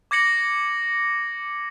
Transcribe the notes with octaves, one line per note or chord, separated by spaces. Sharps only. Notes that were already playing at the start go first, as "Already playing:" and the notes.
D6 G#6 A#6 C#7 F#7